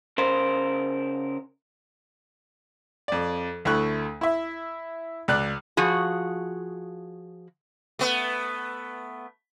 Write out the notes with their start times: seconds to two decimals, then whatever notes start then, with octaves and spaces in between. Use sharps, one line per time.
0.18 C#3 A#4 C5
3.08 F2 D5
3.65 D2 A3 E4 C#6 F#6
4.21 E4 E5
5.28 C#2 D5 F#6
5.77 F3 F#4 G#4
7.99 A3 B3